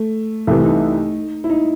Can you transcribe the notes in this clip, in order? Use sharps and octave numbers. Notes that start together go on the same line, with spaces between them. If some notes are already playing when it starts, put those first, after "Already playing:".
Already playing: A3
C2 C3 E3 A3
D#4
E4
D#4